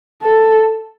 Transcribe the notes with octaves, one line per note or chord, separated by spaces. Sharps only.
A4